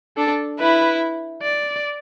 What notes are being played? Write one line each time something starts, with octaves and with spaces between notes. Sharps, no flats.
D4 A4
E4 B4
D5